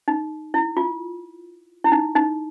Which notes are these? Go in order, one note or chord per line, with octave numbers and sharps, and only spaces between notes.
D#4
E4
F4
E4
D#4
D#4